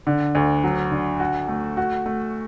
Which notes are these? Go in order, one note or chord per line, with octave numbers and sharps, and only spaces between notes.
D3
D2
F#3
D3
F#4
A3
F#4
A3